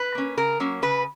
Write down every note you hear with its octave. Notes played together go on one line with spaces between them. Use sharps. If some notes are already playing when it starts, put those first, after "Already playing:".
Already playing: B4
A#3 C#4
C#3 A#4
F#3 A#3 C#4
C#3 B4